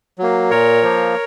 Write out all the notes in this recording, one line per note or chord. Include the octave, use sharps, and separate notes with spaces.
F#3 A#3
A#2 A#4 C#5
F3 A#3